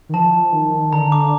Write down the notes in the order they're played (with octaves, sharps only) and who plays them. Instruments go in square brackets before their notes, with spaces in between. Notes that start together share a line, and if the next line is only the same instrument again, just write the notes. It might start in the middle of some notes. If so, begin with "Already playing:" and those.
[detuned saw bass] D#3
[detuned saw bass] F3 [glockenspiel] A5
[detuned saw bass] D#3
[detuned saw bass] D3 [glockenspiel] A#5
[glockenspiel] D6